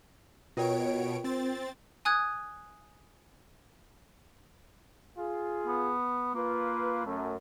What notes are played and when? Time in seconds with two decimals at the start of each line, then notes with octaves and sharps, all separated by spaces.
0.57 B2 F4 A#4 C#5 G5 D7
1.24 C4 A6
2.05 G#5 D#6 F#6 G#6
5.17 F4 G#4
5.67 B3
6.35 A#3 F4 B4
7.05 F#2 A3